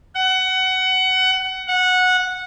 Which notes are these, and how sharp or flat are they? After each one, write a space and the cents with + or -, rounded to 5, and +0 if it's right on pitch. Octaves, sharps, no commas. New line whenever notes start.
F#5 +20
F#5 -15